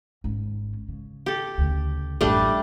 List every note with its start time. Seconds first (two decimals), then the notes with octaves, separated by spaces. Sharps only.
0.24 G#1 C#4
0.88 C#3
1.26 G4 A4
1.58 D2 C#3
2.21 A1 F#2 G3 A3 D4